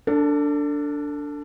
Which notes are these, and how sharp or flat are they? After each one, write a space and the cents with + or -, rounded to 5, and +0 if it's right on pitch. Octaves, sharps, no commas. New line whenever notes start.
D4 -10 A4 +30